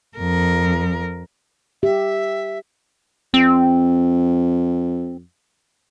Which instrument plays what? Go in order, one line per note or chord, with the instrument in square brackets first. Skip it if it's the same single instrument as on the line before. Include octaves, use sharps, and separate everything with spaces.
[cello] F2 A#4
[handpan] G4 [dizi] E5
[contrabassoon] F2 [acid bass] C4